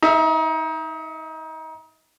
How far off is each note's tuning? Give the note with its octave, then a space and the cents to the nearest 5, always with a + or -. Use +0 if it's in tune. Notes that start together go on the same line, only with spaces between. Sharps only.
D#4 +30 E5 +0